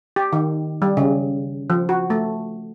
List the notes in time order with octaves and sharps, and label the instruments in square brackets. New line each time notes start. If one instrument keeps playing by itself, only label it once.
[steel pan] G4
D#3
G3
C#3
F3
F#4
A3